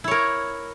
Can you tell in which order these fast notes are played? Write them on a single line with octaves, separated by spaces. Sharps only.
E4 C#5 A#4